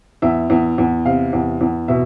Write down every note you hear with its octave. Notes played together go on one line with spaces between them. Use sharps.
E2 E5
E2
E2
C3 F5
E2
E2
B2 E5